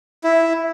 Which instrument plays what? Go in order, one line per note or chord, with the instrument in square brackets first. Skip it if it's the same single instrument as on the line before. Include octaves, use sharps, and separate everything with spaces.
[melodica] E4